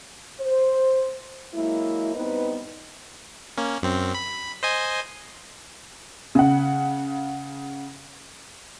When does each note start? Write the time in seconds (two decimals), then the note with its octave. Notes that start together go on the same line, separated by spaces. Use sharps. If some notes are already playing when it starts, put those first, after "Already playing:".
0.40 C5
1.54 F#3 G#3 A#3 E4
2.15 G2 B3 C4 D#4 B4 D#5
3.58 A#3 C#4
3.82 F#2 C4
4.15 B5
4.63 C5 D#5 G#5
6.35 C#3 F#5